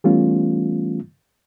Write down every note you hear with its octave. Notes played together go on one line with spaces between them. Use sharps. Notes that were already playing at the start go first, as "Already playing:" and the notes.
E3 G3 A3 B3 C#4 F4